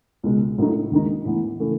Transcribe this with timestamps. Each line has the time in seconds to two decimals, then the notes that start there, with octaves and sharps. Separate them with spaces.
0.23 C#2 B2 G#3
0.58 A2 F#3 A3 D#4
0.91 D#2 D#3 G#3 D#4
1.25 A2 E3 B3
1.60 C#3 E3 A3